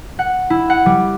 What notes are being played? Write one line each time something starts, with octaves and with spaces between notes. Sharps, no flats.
F#5
E4
F#5
G3